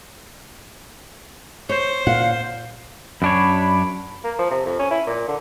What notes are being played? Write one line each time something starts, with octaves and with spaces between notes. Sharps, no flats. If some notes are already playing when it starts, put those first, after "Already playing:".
C5 C#5
A#2 F5 F#5
F#2 D4 C#5 B5
A#3
F3
C3
F2
C#4
E4
A#2
D3